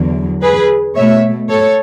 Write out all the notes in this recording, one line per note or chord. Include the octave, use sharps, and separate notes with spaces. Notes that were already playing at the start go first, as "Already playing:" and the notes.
Already playing: E2 D3 F#3
G#4 B4
B2 A3 C#5 E5
A4 C#5